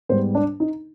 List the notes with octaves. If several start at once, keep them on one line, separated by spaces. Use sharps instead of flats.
G#2 G3 B3 C5
D4
D#4